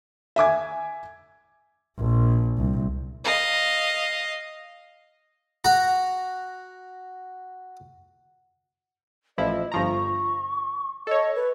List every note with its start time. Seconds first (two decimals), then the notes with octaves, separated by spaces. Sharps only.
0.36 E5 G#5 D6 G#6
1.98 A#1
2.57 C2
3.25 D#5 F5
5.64 F#4 A#5
9.38 A1 F3 E4 D#5
9.72 G1 F3 A#5 C#6
11.07 A4 C#5 D#5
11.35 B4